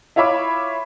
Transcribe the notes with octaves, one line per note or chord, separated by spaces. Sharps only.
E4 F4 C#5 E5 B5 D6